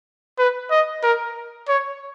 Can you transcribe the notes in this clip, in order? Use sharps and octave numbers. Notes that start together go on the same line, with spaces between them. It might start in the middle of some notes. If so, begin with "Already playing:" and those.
B4
D#5
A#4
C#5